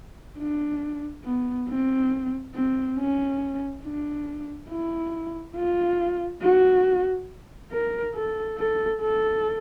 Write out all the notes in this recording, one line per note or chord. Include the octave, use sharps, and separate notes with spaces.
D4
B3
C4
C4
C#4
D4
E4
F4
F#4
A#4
A4
A4
A4